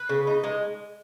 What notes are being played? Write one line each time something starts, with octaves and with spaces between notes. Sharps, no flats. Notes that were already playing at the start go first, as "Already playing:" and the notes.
Already playing: B4
C#3
D#4
G#3